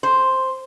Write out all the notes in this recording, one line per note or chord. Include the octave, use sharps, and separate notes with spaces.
C5